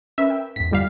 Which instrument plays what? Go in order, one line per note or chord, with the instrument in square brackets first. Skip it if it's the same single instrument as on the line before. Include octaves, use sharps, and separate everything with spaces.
[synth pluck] C#4 A#4 B4 [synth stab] E5
[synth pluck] G5
[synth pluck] E2 G#2 [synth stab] B6
[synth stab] G1 G3 F5